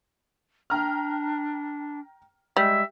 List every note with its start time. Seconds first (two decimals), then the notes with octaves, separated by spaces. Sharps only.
0.70 D4 G5 A#5 F6
2.57 G3 G#3 E5